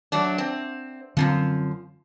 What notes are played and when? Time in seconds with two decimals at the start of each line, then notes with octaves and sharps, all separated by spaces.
0.12 F#3 A3 D4
0.38 C4
1.17 F#2 A#2 D3 F3 C4